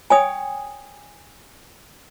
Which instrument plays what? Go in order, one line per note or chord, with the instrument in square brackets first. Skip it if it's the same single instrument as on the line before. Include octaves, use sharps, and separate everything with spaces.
[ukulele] C#5 G5 [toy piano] G#5 D#6